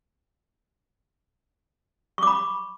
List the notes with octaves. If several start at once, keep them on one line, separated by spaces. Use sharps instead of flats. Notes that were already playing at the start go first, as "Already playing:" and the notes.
B5 C#6 D6